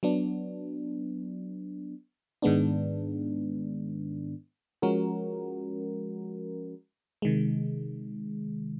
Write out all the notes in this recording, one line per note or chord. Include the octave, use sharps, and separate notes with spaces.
F#3 B3 D4
G#2 D#3 G#3 B3 D4
F3 G#3 C#4 F#4 A#4
C3 D#3 G#3